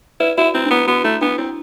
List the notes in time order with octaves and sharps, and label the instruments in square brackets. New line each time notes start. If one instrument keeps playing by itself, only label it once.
[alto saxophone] E4 [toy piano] B4 D5
[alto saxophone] E4 [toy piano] F#4
[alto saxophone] C4 [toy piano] E4
[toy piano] D4
[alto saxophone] B3 [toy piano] E4
[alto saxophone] B3 [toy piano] F#4
[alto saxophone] A3 [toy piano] E4
[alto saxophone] B3 [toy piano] D4
[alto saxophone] C4 [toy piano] E4